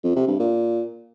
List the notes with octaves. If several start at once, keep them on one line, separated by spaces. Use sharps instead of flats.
F2
C3
G2
A#2